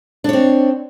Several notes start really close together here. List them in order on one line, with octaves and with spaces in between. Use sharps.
D4 C#5 C4